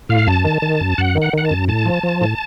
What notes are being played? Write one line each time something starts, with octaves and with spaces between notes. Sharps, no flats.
A2 F5
F#2 A5
D#3
D#3
F#2
F#2 F#5
D#3
F#5
D#3 F#5
A5
F#2
A2 A5
F3
F3
A2